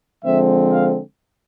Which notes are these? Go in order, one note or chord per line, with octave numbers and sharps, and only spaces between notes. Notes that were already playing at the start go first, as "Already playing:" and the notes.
D3 F3 G#3 C4 E5
F5